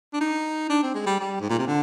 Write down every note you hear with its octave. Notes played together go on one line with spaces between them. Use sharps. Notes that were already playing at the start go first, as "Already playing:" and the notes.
D4
D#4
D4
C4
G#3
G3
G3
G#2
A#2
C3
D3